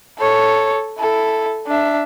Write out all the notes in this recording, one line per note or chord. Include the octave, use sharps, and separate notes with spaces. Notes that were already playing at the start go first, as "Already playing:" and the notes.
A4 C#5
E4 A4
D4 E5